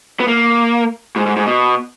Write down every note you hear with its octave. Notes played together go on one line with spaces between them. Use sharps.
B3
A#3
G#2
G#2
G#2
B2